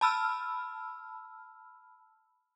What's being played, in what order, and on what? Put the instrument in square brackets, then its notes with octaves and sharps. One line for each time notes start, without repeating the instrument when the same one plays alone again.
[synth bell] A5 B5 E6 F6